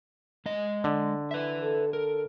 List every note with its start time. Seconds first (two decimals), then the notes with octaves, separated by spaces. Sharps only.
0.46 G#3 D#5
0.84 D3
1.31 B4 E5
1.62 A4
1.93 A4 A#4